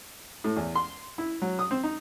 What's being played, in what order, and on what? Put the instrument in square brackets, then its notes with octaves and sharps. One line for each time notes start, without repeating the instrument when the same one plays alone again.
[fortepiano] A2
E2
C6
E4
F#3
D#6
C4
D#4